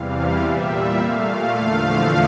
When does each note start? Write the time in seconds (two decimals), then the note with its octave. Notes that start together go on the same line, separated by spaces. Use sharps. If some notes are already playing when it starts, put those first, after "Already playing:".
Already playing: E2 C3 E3 G3 F5
0.40 A#2 G3 E5
0.69 E5
0.98 A#2 A3 F5
1.27 F5
1.56 E2 D3 F3 A3
1.85 F5